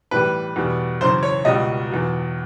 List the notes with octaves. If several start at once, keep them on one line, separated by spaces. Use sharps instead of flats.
A2 E3 G3 B4
E2 B2 G3
F#2 C#3 E3 C5
C#5
C#2 B2 G3 D#5
E2 B2 F#3